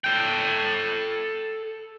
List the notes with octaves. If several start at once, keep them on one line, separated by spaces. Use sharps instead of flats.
A4 G5